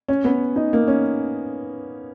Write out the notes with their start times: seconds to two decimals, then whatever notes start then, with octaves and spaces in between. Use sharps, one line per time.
0.08 C#4
0.24 B3
0.56 D#4
0.73 A#3
0.88 C#4